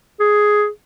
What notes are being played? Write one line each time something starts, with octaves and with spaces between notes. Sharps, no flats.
G#4